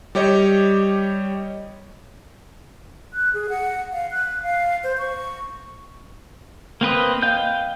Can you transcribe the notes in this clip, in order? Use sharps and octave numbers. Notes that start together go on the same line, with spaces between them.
G3 G4 C#5 D#5
F#6
G#4
F#5
F5
F#6
F5
C5
C#6
A#3 C4 B4 D#5
D#5 F5 G5 G6